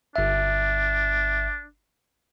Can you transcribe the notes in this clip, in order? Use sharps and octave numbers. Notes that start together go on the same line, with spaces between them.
G1 D4 E5